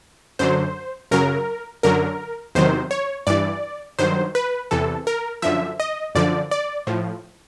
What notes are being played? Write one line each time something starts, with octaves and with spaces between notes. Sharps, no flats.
F#2 D3 F#3 C5
F#2 C#3 F#3 A#4
F#2 D3 F#3 A#4
E2 C3 D#3 F#3 C5
C#5
G2 E3 D5
G2 D#3 F#3 C5
B4
E2 C3 E3 A4
A#4
F#2 D3 F3 E5
D#5
F#2 D3 F3 D5
D5
A2 F3